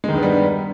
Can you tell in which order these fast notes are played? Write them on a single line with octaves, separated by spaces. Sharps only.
G#3 D#3 G2 B3 G3